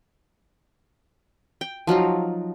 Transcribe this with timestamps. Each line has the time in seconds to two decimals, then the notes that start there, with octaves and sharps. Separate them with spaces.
1.61 G5
1.87 F3 F#3 D#4 F4